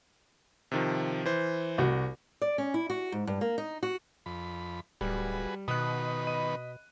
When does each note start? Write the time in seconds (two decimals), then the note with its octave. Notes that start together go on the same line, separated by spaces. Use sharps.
0.71 C3 D#3 F3
1.25 E3 C5
1.78 C2 F#4
2.42 D5
2.58 C#4
2.74 E4
2.90 F#4
3.12 G#2
3.27 G2
3.41 A#3
3.58 D#4
3.83 F#4
4.26 F2 B5
5.01 D1 G3 F#4 G#4 B4
5.68 B2 D#3 B3 B4 D#6 F#6
6.27 D#5 B5 D#7